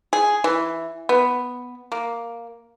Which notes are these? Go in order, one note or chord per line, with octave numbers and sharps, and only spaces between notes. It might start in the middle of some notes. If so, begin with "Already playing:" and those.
G#4
E3
B3
A#3